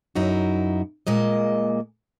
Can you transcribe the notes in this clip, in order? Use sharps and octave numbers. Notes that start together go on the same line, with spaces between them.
F#2 D#4 E4 F#4
A#2 G#3 A#3 D#5